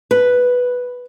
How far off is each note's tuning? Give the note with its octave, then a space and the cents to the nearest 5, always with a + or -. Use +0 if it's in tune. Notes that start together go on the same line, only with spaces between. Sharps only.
B4 +0